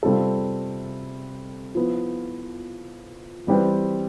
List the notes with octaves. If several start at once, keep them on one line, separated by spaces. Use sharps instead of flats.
C3 G3 C4 F4 A4
F3 B3 E4
E3 G3 C4 G4 B4